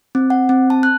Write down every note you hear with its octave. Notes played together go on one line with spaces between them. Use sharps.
C4
F#5
C4
A5
F#6